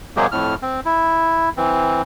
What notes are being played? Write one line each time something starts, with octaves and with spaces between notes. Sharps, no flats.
C3 F#3 G#3 A#3 G4 G#4
F2 A2 F6
C4
E4
E3 C4